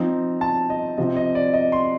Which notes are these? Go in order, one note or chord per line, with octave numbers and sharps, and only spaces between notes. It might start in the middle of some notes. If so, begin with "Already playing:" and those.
Already playing: F3 C4 D#4
A5
D#5
C3 F3 C4 D#5
D#5
D5
D#5
C6